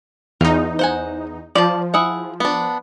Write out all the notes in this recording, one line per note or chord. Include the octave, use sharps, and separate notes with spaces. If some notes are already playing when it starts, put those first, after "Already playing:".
E2 D#4 F4
C5 F#5 G#5
F3 D5 A5
E4 G#4 F#5
B3 D4